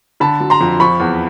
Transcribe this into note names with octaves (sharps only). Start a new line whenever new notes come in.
D3 A5 B5
F#3
A#5 C6
F2
F3 B5 C#6
E2